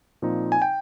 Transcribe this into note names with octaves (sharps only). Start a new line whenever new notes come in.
A#2 F3 C4 D#4
G#5
G5